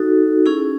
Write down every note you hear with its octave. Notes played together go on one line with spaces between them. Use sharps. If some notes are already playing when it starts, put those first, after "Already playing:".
Already playing: D#4 F#4 A4
C#4 E4 G#4